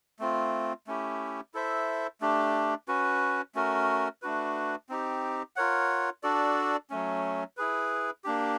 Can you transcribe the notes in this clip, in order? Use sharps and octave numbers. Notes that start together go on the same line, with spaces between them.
A3 C4 F4
A3 C#4 E4 G4
E4 A4 C5 E5
A3 D4 G4
C#4 F#4 B4
A3 C#4 F#4 A#4
A3 D4 F#4 B4
C4 D#4 G4
F4 A#4 C#5 F#5
D4 F#4 A4 D5
F#3 A3 C#4
E4 G#4 B4
A#3 D4 G4